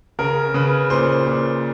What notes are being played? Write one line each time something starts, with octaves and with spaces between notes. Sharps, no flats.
C#3 A#4
C#3 B4
A#2 C5
A#2